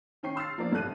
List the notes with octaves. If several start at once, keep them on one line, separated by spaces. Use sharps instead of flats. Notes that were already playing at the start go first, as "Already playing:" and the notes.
D#3 C#4 G5 C#6 C7
C6 E6 F6 A6 C7
F3 A#3 B3 D4 A#4 D5
A1 G2 C3 A4 F#6 D#7